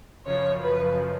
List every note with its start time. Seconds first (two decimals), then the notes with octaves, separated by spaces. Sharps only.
0.25 F#2 C#3 F3 C#5
0.61 B4